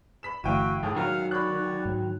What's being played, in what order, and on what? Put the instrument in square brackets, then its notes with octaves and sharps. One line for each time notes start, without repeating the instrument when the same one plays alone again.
[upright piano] B5 B6 E7
[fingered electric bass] G1 E3 A3 [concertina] E4 F#4 [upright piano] F5 G5 D#7
[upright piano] D#2 A2 [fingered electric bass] G#3 [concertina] G#4 A4
[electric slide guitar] D#3 F#3 [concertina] F5 F#5 F6 [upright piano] A#5
[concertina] F#4 C#5 D5 [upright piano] B5 F#6
[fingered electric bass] G#2